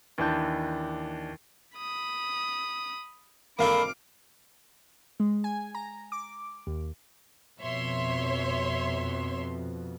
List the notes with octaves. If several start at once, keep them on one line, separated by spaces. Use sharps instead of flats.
D#2 E3 D4 A5 G6
B5 D#6
G#1 A#3 D4 A4 F5 B5 D6
G#3
G#5
A#5
D6
D#2
F2 B2 C#5 E5 C6